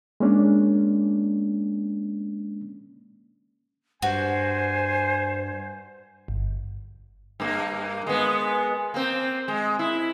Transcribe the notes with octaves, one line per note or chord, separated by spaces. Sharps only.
G#3 A#3 C#4 D4
G2 F#4 C5 G#5
G1
G2 A#3
G#3 B3
A#3 C4
G#3
E4